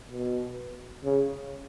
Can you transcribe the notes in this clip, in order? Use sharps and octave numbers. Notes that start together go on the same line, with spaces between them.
B2
C#3